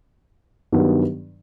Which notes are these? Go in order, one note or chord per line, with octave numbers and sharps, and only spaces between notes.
G2 D#3 F#3 B3 D4